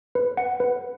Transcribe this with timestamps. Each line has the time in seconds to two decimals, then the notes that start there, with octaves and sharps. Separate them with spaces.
0.15 B4
0.37 F#5
0.60 B4